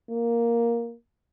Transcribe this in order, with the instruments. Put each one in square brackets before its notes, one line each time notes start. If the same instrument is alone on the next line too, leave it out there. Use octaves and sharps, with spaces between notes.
[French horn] A#3